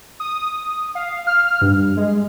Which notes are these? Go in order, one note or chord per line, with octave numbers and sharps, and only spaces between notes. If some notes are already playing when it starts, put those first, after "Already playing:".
D#6
F5
F6
G2
G#3